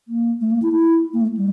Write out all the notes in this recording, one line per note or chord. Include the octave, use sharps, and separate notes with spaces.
A#3
A3
A#3
E4
E4
A#3
A3
G3